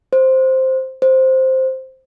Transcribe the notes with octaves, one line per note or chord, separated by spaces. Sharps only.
C5
C5